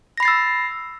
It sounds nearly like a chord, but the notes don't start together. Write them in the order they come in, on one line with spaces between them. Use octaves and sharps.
A#6 B5 C7 A6 E6